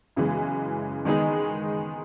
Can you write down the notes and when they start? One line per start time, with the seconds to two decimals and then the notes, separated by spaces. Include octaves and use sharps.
0.16 F#2 C#3 E3 G#3 B3
1.05 D#3 G#3 B3 D#4 G#4